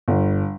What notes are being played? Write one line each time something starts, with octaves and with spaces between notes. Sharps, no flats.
G1